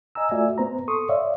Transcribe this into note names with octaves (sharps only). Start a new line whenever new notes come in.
D#5 G#5 A#5 E6
A3 F4 F#4 D5 E5 G#5
B3 C5 A#5
A4 C6 C#6 D#6
C#5 D5 E5 F5